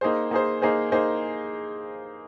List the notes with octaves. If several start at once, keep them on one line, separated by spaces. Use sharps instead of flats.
A#3 D#4 G#4 C5
A#3 D#4 G#4 C5
A#3 D#4 G#4 C5
A#3 D#4 G#4 C5